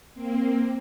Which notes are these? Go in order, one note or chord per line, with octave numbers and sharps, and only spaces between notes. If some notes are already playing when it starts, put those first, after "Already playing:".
A#3 C4